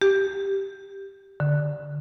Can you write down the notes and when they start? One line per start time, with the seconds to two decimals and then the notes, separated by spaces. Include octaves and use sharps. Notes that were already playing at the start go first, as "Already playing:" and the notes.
0.02 G4
1.40 D3